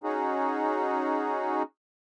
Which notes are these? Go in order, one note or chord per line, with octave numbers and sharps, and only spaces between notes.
C#4 D#4 F#4 G#4